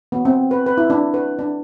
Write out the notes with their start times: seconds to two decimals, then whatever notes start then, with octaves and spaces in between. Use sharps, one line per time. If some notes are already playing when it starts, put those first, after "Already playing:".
0.12 B3
0.25 C4
0.51 B4
0.66 B4
0.78 E4
0.90 D4
1.14 B4
1.39 D4